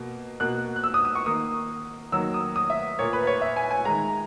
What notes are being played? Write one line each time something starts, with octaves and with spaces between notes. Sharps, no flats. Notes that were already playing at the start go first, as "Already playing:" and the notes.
Already playing: B2 A#3
B2 A#3 F#6
F#6
E6
D#6
D#6
C#6
D#3 A#3 D#6
D#3 F#3 A#3 E6
D#6
D#6
E5
A#2 A#3 C#5
B4
C#5
E5
G#5
G#5
D#3 G#3 A#5